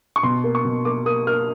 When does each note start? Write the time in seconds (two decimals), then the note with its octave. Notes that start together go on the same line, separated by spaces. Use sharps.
0.16 C#6
0.23 B2 C6
0.44 A#3
0.55 C#6
0.65 B2
0.85 A#3 D6
1.06 A#3 D#6
1.27 A#3 F6